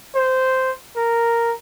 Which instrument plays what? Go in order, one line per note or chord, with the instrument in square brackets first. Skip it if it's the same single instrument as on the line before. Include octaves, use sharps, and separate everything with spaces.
[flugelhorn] C5
A#4